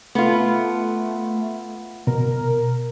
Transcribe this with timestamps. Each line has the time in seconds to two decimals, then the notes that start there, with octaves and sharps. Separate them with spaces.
0.15 A3 B3 F4
2.07 B2 A#4